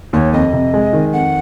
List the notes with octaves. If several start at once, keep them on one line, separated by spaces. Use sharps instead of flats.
D#2 C#5
F2 D#5
C3
G#3
D#3
F2 F#5